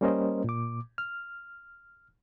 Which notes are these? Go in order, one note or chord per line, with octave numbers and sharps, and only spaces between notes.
G3 A#3 C#4 A#4 C5 D#5
A#2 D6
F6